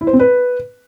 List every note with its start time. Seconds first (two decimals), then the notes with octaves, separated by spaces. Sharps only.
0.01 E4
0.07 C5
0.13 C4
0.19 B4